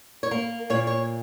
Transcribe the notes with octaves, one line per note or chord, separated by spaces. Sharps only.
C#5
A#3 A#4
A#2 C#5
C#5